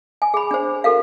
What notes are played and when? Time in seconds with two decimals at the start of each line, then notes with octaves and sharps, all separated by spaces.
0.22 G#5
0.34 G#4 B5
0.51 D4 C5
0.84 F#4 A4 A#4 F5